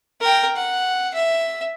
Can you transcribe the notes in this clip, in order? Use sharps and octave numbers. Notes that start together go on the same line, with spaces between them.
A#4 G5
F#5
E5